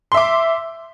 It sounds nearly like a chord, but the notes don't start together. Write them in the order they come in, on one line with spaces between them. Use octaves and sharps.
C6 E5 D6